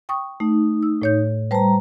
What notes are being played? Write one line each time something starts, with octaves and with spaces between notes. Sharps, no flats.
G5 C#6 D#6
A3 D#4
E6
A2 C#5 G6
G3 B4 C5 A5 A#5